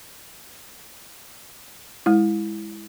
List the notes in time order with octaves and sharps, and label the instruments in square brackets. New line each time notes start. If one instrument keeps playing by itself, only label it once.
[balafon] G#3 E4